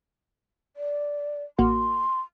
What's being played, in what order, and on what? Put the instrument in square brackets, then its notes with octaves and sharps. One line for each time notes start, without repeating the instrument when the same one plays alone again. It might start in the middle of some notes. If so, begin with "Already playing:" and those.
[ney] D5
[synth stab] A1 A#3 F#4 [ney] C6